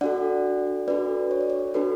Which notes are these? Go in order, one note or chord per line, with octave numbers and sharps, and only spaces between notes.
D4 F#4 A4 D5 F#5
D4 F#4 A4 B4 D5
C#5
D5
C#5
D4 F#4 A4 B4